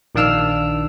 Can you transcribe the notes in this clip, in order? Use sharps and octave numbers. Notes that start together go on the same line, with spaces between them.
A#1 D#3 D4 F5 E6 F6